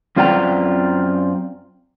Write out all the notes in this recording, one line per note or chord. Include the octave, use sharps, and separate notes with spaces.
F#2 C4 F4 D5 G5 A#5